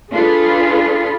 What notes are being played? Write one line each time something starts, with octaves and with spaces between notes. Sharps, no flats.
D4 F4 G#4 A4 B4